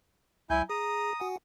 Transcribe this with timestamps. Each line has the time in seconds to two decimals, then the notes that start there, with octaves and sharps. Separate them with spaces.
0.50 C#2 F#3 E4 G#5 G6
0.70 G#4 A#5 D#6
1.20 F#4 F#5 G#5